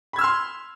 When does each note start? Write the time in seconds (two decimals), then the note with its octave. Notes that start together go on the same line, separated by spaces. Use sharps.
0.13 B5
0.16 G#6
0.19 E6
0.21 F6
0.24 C6